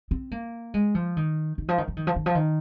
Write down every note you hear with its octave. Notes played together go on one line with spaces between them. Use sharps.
C4
A#3
G#3
F3
D#3
D#3
F3
D#3
F3
D#3
F3
D#3
F3
D#3